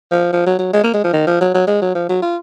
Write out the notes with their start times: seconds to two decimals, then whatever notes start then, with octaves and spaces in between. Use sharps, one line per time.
0.11 F3
0.33 F3
0.46 F#3
0.59 F#3
0.73 G#3
0.83 A#3
0.94 G#3
1.04 F3
1.13 D#3
1.27 F3
1.41 F#3
1.54 F#3
1.67 G#3
1.82 F#3
1.95 F3
2.09 F#3
2.22 F4